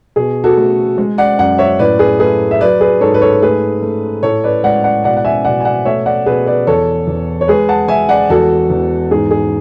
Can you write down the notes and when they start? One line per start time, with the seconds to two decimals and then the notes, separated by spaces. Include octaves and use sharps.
0.16 B2 G#4
0.44 F#4 A4
0.58 A3
0.98 G#3
1.18 D5 F#5
1.39 F#2 D5 F#5
1.58 C#5 E5
1.79 A2 B4 D5
1.99 G#4 B4
2.20 A3 G#4 B4
2.51 E5
2.61 F#3 B4 D5
2.81 G#4 B4
3.01 G#2 A4 C#5
3.14 B4
3.22 A4 C#5
3.42 A3 G#4 B4
3.82 A3
4.23 A2 A4 C#5
4.44 B4 D5
4.64 G#3 D5 F#5
4.84 D5 F#5
5.04 B2 D5 F#5
5.17 F#5
5.25 E5 G#5
5.44 B2 D5 F#5
5.60 G#5
5.65 D5 F#5
5.85 A3 C#5 E5
6.06 D5 F#5
6.26 B2 G#4 B4
6.46 B4 D5
6.67 E2 A4 C#5
7.07 E2
7.41 C#5
7.48 G#3 G#4 B4
7.69 F#5 A5
7.88 G#3 E5 G#5
8.09 D5 F#5
8.30 E2 F#4 A4
8.70 E2
9.11 G#2 G#4
9.31 G#4